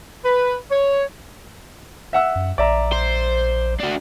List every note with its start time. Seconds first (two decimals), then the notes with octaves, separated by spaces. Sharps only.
0.24 B4
0.71 C#5
2.13 E5 F#5 E6
2.35 F#2
2.58 A#1 D5 E5 A#5
2.92 C5
3.80 D4 F#4